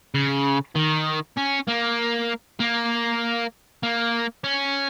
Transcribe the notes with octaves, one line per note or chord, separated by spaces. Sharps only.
C#3
D#3
C#4
A#3
A#3
A#3
C#4